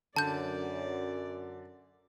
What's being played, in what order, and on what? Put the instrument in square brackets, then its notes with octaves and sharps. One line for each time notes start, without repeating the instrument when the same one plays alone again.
[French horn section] F#2 [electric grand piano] D3 [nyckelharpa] D5 [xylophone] A5 G6